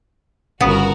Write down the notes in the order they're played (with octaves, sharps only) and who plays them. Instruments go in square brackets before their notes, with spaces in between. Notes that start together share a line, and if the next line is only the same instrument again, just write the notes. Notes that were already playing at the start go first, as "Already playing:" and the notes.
[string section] G1 F#4 A#4 [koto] C#3 B3